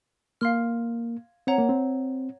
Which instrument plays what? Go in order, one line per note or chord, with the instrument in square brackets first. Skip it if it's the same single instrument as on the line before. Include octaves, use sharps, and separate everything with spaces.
[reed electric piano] A#3 [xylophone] F5 C6 F6
[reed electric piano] C4 [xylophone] C#5 F#5 A#5
[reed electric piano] A#3
C4